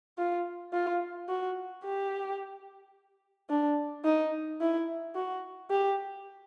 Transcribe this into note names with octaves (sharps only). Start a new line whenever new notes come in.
F4
F4
F#4
G4
D4
D#4
E4
F#4
G4